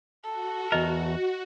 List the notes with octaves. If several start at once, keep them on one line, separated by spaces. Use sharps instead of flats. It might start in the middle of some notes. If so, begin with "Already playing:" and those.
F#4 A4
E2 A#4 D#5